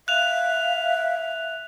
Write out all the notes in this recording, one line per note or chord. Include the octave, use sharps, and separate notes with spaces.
E5 F5 F#6 F7